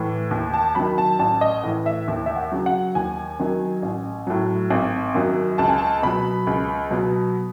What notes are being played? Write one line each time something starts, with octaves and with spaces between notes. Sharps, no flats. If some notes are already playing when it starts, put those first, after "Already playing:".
Already playing: A2 E3
D#2
A5
D#3 F#3 B5
A5
A1 A5
D#5
A2 E3
E5
D#2
E5
F#5
C#3 F#3
F#5
D#2 G#5
D#3 F#3
A1
A2 F#3
G#1
F#2 D#3 F#3
C#2 A5
G#5
A5
B2 F#3 B5
C#2
B2 F#3